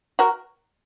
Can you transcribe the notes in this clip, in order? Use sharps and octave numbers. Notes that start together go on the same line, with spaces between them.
F#4 A#4